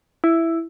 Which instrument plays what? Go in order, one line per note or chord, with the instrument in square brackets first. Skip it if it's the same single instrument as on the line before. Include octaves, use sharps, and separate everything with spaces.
[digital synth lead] E4